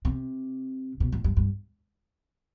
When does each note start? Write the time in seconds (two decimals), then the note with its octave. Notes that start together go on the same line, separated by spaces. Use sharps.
0.05 C3
1.00 B2
1.12 A2
1.24 G2
1.37 G2